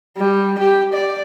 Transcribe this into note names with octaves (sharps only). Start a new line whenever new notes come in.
G3
G4
D5